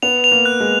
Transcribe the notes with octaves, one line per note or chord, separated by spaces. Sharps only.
B3 F7
F7
A#3
F#6
G#3